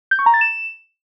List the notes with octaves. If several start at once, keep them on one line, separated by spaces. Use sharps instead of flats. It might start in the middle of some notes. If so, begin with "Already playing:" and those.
G6
C#6
A#5
A6
E7